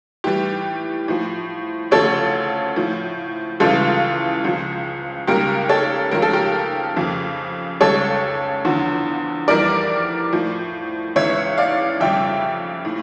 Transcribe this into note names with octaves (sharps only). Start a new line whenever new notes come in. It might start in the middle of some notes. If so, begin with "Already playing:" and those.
A2 E3 G3 G4
A2 F3
D2 C#3 F3 A4 C#5
A2 F3
C#2 C#3 E3 G3 F4 A4
C#2 C#3 F3
C#2 C#3 G3 G4 A#4
A4 C#5
C#2 C#3 F3 A#4
A4
G4 A#4
F2 C#3 F3
C#2 C#3 G3 A4 C#5
E2 D3 F3
F2 E3 G3 A#4 D5
A2 F3
C#2 C#3 E3 C#5 E5
D5 F5
F2 C#3 G3 E5 G5
A2